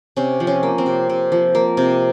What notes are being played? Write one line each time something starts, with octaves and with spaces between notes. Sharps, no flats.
C3 C#4
F3
C#4
A#3
C4
C3
C3
F3
A#3
C3